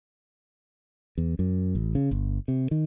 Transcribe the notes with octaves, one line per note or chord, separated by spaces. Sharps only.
E2
F#2
A1
C#3
G1
C3
D#3